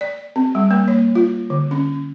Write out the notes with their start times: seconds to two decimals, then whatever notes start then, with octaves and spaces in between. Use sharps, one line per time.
0.01 D5
0.36 C4
0.55 G3
0.71 A#3
0.88 C#5
1.15 F4
1.50 D3
1.71 C#4